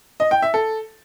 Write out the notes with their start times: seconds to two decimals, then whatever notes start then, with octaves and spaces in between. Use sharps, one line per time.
0.20 D#5
0.31 G5
0.42 E5
0.54 A4